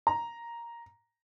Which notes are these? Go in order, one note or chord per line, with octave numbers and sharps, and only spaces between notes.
A#5